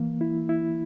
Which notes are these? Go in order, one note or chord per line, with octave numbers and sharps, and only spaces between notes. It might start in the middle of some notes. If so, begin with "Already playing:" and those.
Already playing: E3 A#3
E4
E4